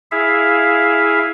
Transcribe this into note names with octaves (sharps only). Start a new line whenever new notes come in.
E4 G#4 E5 F5